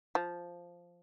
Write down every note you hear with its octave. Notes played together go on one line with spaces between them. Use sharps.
F3